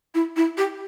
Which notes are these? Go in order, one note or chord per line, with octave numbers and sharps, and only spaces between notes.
E4
E4
G4